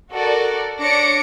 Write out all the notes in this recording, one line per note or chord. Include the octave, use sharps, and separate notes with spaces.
F#4 A4 A#4 D5
D4 C#5 D6 A#6 C#7 D7